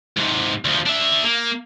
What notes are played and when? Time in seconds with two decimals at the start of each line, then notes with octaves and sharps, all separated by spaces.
0.17 G#2 C3
0.65 D2 F3
0.86 D4 E5
1.24 A#3